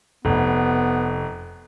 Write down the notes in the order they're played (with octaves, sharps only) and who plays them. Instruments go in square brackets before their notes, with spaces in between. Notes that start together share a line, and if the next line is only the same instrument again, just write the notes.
[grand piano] F1 [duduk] B3